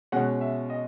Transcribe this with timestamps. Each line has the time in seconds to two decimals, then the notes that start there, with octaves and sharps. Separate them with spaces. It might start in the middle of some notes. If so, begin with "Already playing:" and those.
0.12 B2 G#3 C#4 F#5
0.41 E5
0.70 D#5